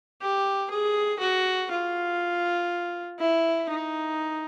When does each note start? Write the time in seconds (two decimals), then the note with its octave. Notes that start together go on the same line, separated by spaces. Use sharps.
0.21 G4
0.71 G#4
1.20 F#4
1.71 F4
3.19 E4
3.69 D#4